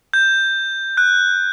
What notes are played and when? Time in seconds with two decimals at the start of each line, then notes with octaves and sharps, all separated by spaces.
0.13 G6
0.97 F#6